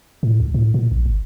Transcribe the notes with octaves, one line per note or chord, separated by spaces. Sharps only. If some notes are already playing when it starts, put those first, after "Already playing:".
A2
C#2
A2
A#2
A#1
G1